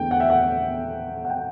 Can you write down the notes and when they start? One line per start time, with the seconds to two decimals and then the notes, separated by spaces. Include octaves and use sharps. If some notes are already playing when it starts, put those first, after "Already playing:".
Already playing: E2 D3 A3 G5
0.11 F#5
0.20 E5
0.30 F#5
1.25 F#5
1.30 G5